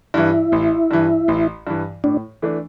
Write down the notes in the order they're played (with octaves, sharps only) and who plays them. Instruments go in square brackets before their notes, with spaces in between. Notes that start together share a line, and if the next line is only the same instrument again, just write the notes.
[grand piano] G2 E3 [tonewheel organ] E4
[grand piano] A1
G2 E3
A1
G2 E3
[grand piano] A2 [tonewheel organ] D4
[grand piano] E3 A3 D4